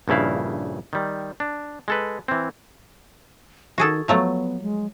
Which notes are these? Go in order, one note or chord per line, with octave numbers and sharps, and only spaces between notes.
A#1 G2 C#3 E4 F5
D#3 G3
D4
G#3 A4 B4
E3 C4
D#3 F#4 G#4 A4
F3 F#3 A3 B3
G#3